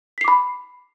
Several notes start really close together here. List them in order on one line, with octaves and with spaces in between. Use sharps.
B6 C7 D6 B5